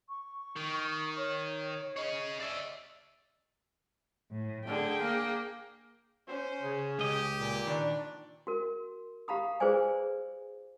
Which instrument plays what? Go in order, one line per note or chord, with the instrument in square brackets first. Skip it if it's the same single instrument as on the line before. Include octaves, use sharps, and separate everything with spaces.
[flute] C#6
[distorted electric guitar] D#3
[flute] C#5
[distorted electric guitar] G#4 C#5 [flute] D#5
[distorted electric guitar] D5 E5
[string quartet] A2
[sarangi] D3 [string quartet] G#4 G5
[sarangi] A#3
[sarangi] C#4 [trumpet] C5
[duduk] C#3
[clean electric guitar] C#2 D#5 [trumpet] G4
[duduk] A#2
[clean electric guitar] D#3 E3 [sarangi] D4
[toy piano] F#4 A#4
G4 F5 A#5 B5 D#6
F4 G#4 B4 C5 D5 G#5